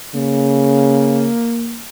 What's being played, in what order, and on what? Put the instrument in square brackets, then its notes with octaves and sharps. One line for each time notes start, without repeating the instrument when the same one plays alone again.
[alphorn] C#3 [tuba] A#3